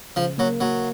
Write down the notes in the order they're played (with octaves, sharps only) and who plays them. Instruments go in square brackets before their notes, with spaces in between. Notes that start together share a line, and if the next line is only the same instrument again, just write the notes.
[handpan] C#3 [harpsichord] F3
[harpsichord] F#3 [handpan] A#3
[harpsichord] F#3 [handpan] A#3